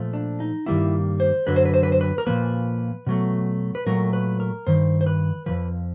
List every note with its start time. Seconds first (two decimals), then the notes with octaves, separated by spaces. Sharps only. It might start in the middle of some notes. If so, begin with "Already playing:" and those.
Already playing: A#2 F3 A3
0.13 D4
0.40 D#4
0.66 G2 D#3 G3 A#3 E4
1.20 C5
1.47 F#2 D3 F#3 B4
1.56 C5
1.65 B4
1.74 C5
1.83 B4
1.92 C5
2.01 B4
2.18 A#4
2.27 A#2 F3 A#3 B4
3.07 B2 F#3 A3
3.75 B4
3.86 A#2 F#3 A3 A#4
4.13 B4
4.40 A#4
4.67 G2 D#3 C5
5.01 C5
5.06 B4
5.46 F2 C3 F3 B4